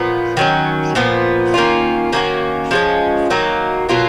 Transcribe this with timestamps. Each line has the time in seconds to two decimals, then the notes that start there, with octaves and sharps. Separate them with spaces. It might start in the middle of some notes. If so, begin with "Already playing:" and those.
Already playing: A#2 F3 B3
0.37 D#3 F#3 C#4
0.95 A#2 F3 B3
1.54 D#3 A#3 C#4 F4
2.12 D#3 A#3 C#4 F#4
2.71 F3 G#3 C#4
3.30 D#3 F#3 A#3
3.89 B2 F#3 A#3 F4